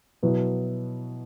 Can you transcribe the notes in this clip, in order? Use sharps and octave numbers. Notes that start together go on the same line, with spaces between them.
B2 F#3 B3 E4